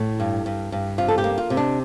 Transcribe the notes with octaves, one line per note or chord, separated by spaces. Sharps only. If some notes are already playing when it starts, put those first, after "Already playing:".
Already playing: A2 E4
G2
G2
G2
C3 F4
A4
G4
A#3
F4
C3
D4